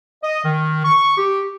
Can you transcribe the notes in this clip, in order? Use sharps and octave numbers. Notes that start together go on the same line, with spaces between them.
D#5
D#3
C#6
G4